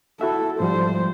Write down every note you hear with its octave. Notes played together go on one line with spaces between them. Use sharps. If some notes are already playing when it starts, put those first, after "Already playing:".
E4 F#4 A4 E5
G#2 F3 G3 C5